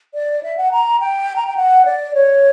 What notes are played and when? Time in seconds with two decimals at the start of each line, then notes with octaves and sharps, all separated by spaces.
0.14 D5
0.43 E5
0.57 F#5
0.72 A#5
1.00 G5
1.36 A#5
1.47 G5
1.57 F#5
1.85 D5
2.15 C#5